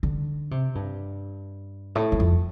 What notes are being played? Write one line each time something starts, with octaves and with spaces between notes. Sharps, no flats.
D3
C3
G2
A2
G2
F2